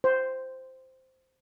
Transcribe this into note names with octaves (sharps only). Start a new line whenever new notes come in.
C5